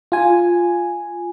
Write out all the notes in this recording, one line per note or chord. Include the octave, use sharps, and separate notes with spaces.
F4 G#5